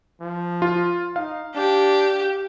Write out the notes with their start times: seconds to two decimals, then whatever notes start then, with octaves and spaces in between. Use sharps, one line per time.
0.21 F3
0.62 F4
1.16 D#4 F5
1.55 D4 G4